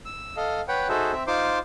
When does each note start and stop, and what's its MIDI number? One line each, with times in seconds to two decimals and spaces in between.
0.05 0.36 88
0.37 0.61 69
0.37 0.61 75
0.37 0.61 77
0.68 0.88 71
0.68 0.88 73
0.68 0.88 78
0.68 0.88 79
0.89 1.12 63
0.89 1.12 66
0.89 1.12 68
0.89 1.12 69
0.89 1.12 72
0.89 1.12 76
1.12 1.24 60
1.12 1.24 76
1.27 1.59 63
1.27 1.59 65
1.27 1.59 72
1.27 1.59 84
1.27 1.59 86